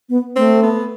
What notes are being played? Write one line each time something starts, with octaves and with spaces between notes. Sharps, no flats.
B3
A3 C4
B3